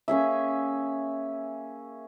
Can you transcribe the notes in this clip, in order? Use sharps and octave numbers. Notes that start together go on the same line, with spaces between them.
A#3 C#4 G#4 E5